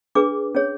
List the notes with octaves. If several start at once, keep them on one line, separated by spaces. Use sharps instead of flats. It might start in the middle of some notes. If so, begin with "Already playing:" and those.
D4 G#4 B4 D6
C#4 G#4 C#5